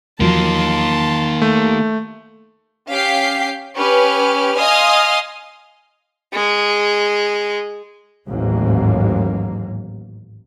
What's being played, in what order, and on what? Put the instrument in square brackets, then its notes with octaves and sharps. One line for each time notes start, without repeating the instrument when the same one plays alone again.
[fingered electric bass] E2 F3 F#3 [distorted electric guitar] D#3 A#3 [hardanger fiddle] A5 C6
[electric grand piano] A3
[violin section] C#4 G4 F5 G5 B6 C7
C#4 G4 B4 F6
D#5 F5 G#5 C6 D#6 F6
[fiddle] G#3 G#4
[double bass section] A1 D#2 G#2 F#3 A#3